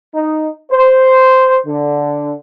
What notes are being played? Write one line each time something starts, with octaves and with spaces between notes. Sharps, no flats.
D#4
C5
D3